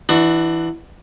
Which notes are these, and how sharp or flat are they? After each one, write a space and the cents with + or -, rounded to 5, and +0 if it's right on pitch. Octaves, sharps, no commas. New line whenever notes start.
E3 +0 D4 +30 F#4 +0